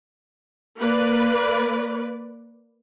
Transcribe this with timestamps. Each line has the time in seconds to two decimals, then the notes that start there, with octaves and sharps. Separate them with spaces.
0.80 A#3 B4 D5